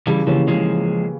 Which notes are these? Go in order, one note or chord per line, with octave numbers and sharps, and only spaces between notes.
C#3 E3 G3
C#3 E3 F3 A#3 C#4 G4
C#3 F3 G#3